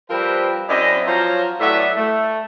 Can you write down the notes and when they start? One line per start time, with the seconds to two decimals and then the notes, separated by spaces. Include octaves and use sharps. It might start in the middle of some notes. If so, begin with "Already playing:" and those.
0.10 F3 G3 C4 A#4 B4
0.70 F#2 C4 E4 D5 D#5
1.07 F3 F#3 C#4 C5 A#5
1.61 A2 F#3 B3 D5 E5
1.97 A3